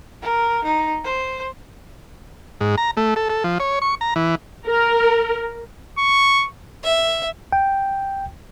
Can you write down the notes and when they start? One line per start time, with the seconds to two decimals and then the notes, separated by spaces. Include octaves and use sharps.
0.22 A#4
0.64 D#4
1.04 C5
2.61 G#2
2.78 A#5
2.97 A3
3.16 A4
3.30 A4
3.44 F3
3.60 C#5
3.82 C#6
4.01 A#5
4.16 E3
4.66 A#4
5.98 C#6
6.83 E5
7.52 G5